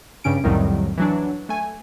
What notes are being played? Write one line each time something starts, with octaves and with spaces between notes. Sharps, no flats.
G2 C#3 C#4 D7
C2 F2 A2 D#3 F#3 G3
E3 F#3 D4
A3 G#5